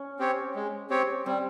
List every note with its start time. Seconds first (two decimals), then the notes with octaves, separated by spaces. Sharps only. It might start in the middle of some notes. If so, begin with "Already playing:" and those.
Already playing: C#4
0.19 C4 G4 C#5
0.55 G#3
0.90 C4 G4 C#5
1.26 G3 C4